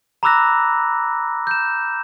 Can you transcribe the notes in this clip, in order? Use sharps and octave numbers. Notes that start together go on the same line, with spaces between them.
A#5 B5 D6 E6 F#6 A#6
G6 E7